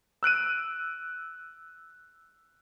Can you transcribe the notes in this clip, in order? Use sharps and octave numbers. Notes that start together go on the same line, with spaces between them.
E6 F#6 D7 D#7